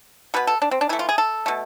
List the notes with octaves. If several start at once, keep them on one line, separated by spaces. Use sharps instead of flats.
B2 B3 B4
A4
D4
C4
D4
E3 A3 E4
F4
G#4
A4
B2 A3